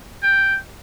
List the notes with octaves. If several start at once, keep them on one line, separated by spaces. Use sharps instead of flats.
G5